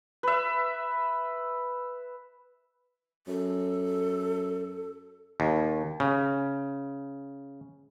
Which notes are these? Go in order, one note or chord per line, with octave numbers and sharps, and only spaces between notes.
B4 E5
F#2 A4
D#2
C#3